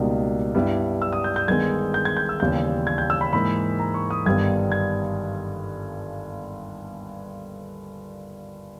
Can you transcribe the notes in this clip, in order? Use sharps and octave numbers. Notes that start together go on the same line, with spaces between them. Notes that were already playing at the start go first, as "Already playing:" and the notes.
Already playing: C#2 B2 G3 A#3 D#4
G2 G3 B3 E4
E6
D#6
G6
G6
G1 G2 D#3 G#3 B3 G#6
G6
G#6
G6
E6
D#2 C#3 E3 G3 B3 G6
G#6
G6
E6
B5
G#2 E3 A#3 B5
A#5
C#6
D#6
G1 G2 D#3 G3 B3 G#6
G#6